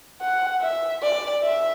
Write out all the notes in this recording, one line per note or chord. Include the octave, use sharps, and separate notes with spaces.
F#5
E5
D5
E5